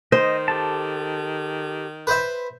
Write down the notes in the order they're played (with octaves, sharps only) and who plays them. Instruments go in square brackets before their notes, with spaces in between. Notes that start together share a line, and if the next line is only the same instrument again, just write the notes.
[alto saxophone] D#3 [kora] C5 [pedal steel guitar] D#5
[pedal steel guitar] G4 A4 A5
[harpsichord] B4 C5 E5